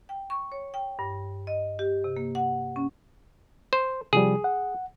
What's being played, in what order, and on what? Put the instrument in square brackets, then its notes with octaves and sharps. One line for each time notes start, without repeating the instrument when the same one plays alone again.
[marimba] G5
C#6
C#5
G5
G2
D#5
G4
C3
A#3
F#5
C#4
[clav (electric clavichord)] C5
[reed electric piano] C3 F3 G3 [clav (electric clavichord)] G#4
[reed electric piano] F#5